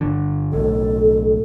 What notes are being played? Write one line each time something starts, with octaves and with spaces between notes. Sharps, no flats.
G1 D3
B1 A2 A4